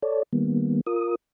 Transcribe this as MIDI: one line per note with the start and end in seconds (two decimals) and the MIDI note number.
0.03 0.23 69
0.03 0.23 73
0.03 0.23 74
0.33 0.81 51
0.33 0.81 55
0.33 0.81 58
0.33 0.81 59
0.86 1.15 65
0.86 1.15 70
0.86 1.15 87